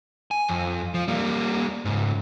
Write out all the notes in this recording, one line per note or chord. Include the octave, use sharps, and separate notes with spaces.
G#5
F2
F3
G3 A#3
C#2 G#2